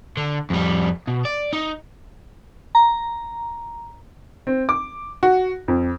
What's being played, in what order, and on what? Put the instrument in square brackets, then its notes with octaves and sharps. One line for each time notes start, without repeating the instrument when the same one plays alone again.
[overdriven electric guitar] D3
F2 G3
B2
D5
D#4
[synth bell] A#5
[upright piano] C4
D6
F#4
F2